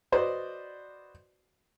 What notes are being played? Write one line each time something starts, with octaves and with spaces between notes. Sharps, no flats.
F#4 B4 C5 D5 D#5